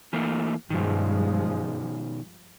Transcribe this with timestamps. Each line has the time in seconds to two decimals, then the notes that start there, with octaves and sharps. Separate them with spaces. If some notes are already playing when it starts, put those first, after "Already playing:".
0.13 E3 A3 A#3
0.70 G2 B2 D#3 F3 G#3